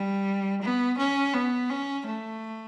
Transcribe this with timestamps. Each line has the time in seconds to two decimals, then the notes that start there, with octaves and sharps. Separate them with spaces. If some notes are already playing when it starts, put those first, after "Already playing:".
Already playing: G3
0.62 B3
0.98 C#4
1.34 B3
1.69 C#4
2.06 A3